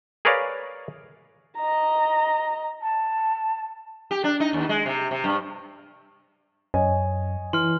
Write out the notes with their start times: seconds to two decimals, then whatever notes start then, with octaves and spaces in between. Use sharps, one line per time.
0.25 G#4 A#4 B4 C#5 D5 F5
1.57 D#5 A#5
2.82 A5
4.11 G4
4.24 D4
4.40 D#4
4.53 D#2
4.69 G#3
4.86 C3
5.11 C3
5.24 G2
6.74 F#2 C#5 D#5 G#5
7.53 E3 C6 F6